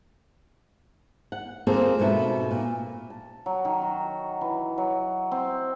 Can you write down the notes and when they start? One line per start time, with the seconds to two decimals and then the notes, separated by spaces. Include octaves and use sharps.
1.32 F#5
1.67 A#3 C4 F4 G#4 A4 C5
1.99 G#2 B2 B3 A4 E5
2.51 A#2
3.10 A5
3.46 F#3
3.65 D#3
3.82 F#4
4.41 E3
4.78 F#3
5.31 C4